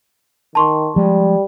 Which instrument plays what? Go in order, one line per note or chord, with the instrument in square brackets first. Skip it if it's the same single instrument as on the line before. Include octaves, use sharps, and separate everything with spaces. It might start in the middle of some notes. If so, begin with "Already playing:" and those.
[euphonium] D#3 [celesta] A5 C6 C#6
[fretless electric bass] F3 G#3 [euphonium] G3